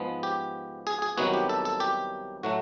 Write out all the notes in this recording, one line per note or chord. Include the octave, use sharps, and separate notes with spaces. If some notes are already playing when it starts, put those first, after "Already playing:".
Already playing: G#2 F3 G#3 B3
G4
G#4
G#4
C2 C3 D#3 F#3 B3 F#4
G4
A4
A4
G4
A2 F#3 A3 F#4